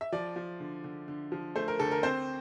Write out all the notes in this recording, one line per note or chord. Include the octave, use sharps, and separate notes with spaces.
E5
F3 D5
F3
D3
D3
D3
F3
A3 C5
A#4
D2 A4
A#4
C4 C5